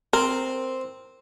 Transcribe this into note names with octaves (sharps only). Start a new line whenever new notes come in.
C4 A#4